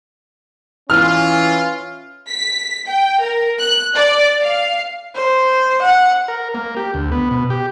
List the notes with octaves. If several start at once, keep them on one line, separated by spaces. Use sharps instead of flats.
E3 C#4 F4 F6
B6
G5
A#4
F#6
D5
F5
C5
F#5
A#4
A#3
G4
D2
B3
B2
G4